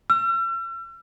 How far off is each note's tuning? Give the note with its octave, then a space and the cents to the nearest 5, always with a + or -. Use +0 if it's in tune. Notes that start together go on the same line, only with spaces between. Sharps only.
E6 +45